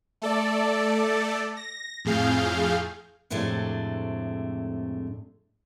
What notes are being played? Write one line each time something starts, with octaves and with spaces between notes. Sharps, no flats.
A3 A4 D5
A#6
F2 A2 G#4 F5 G6
F2 A2 C3 G#3 A3 D4